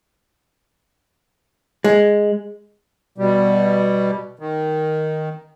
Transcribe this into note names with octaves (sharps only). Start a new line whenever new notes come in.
G#3
B2 G3
D#3